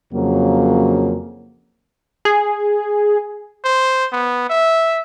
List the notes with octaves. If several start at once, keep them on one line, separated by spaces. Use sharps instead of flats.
F2 C#3 F#3 A#3
G#4
C5
B3
E5